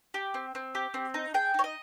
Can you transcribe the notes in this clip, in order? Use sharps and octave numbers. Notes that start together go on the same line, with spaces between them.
G4
C4
C4
G4
C4
D#4
G#4 G5
D#4 C#5
D#5